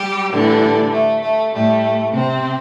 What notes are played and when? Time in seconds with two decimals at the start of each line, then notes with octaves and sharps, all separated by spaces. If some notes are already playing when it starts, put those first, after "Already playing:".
Already playing: G3 G4
0.31 A2 D3 E3 G3 D4
0.91 A3
1.22 A3
1.52 A2 G3 A3
2.11 C3 C4